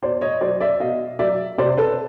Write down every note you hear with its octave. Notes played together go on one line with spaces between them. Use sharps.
B2 C5 D5
C#5 D#5
F#3 C5 D5
D5 E5
B2 D#5 F5
F#3 D5 E5
C3 C5 D5
A4 B4